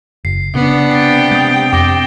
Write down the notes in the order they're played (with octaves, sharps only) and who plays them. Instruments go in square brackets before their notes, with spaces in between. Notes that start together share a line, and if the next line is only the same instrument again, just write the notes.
[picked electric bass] F#1 [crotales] C7
[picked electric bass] C#3 [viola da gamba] B3 D4
[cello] C3 G5 [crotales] A6 C7
[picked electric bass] G#3 [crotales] D#6 G6
[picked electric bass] F2 [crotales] D6 A#6 G7